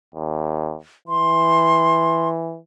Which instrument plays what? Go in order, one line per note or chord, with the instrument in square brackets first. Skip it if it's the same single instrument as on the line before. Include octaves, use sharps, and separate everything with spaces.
[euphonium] D#2
[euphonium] E3 [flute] C6